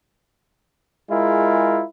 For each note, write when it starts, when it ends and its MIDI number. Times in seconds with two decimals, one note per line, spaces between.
1.10 1.82 56
1.10 1.82 64
1.10 1.82 65
1.10 1.82 68
1.10 1.82 70